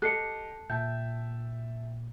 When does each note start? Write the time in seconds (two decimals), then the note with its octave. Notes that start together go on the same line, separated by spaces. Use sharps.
0.02 G4 A4 D#5 F#6 C7 C#7
0.70 A#2 E5 G5 A5 G6